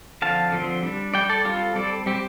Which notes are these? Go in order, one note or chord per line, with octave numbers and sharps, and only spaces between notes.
D3 F3 C4 F5 A5
D3 F3 C4
G3 D4
G3 D4 D5 G5
A4 D5
G3 C4 F4 A4
G3 C4 A4 D5
G3 C4 G4